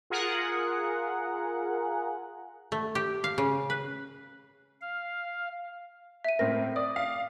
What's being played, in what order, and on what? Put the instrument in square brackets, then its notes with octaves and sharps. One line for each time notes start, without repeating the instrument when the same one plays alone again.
[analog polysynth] F4 G#4 A#4 F#5
[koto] A3
G4
F5
C#3
B4
[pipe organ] F5
[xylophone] E5 D#7
[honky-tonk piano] A2 C4 A#4 [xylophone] A#6
[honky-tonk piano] D5 [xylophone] D#6
[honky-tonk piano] F5